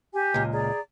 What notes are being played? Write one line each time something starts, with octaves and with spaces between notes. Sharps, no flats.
G4 G#5
C#2 A#2
G#4 D5 A#5